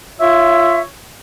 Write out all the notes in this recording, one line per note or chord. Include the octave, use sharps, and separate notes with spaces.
F4 C#5 E5